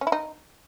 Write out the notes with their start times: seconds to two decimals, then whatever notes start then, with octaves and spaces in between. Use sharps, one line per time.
0.01 C#4
0.07 E4
0.12 D#4